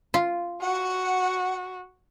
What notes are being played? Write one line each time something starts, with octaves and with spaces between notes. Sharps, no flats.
F4
F#4 F#5